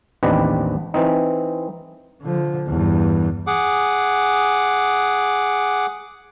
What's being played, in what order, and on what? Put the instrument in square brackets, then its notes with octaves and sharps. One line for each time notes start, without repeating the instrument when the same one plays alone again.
[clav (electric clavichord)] A1 D#2 C4 D4 B4 D#5
E3 C4 D#4
[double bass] D3 F3
E2 G2
[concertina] G#4 F#5 D6